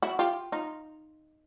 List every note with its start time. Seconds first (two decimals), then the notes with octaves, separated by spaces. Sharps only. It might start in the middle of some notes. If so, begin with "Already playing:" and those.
0.02 E4 F#4
0.19 F4 G4
0.52 D#4 F4